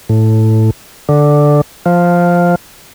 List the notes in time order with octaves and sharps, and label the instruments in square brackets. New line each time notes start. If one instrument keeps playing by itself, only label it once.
[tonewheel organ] A2
D3
F3